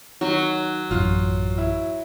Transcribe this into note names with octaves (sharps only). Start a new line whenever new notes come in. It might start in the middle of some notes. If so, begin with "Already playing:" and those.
D#3 F#3
A1 F#2 F4
E4